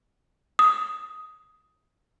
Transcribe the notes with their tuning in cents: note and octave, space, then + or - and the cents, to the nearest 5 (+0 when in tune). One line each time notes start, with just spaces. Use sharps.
D#6 +10